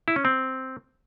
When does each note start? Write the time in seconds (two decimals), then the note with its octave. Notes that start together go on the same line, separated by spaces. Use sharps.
0.08 E4
0.16 C#4
0.25 C4